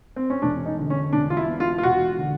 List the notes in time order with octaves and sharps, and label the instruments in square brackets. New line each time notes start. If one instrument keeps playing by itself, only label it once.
[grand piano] C4
C#4
[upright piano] E1 [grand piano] D4
[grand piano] D#4
[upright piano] D3
[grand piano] C#4
[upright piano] E1 [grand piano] D4
[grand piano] F4
E4
[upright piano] B2
[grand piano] F4
F4
[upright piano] E1 [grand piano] F#4
[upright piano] D3